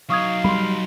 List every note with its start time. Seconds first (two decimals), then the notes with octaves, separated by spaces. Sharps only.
0.10 F#3 D#4 F5 C#6 D#6 G#6
0.44 G3 B5 C6